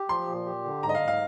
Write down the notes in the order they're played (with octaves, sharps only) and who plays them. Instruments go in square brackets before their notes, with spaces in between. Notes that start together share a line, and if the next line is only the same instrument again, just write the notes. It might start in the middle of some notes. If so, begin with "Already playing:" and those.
Already playing: [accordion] G4
[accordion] F3 [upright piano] C6
[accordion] A#2
G4
D3
[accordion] G#2 [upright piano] A#5
[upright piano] D#5
F5
[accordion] G#2
[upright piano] F5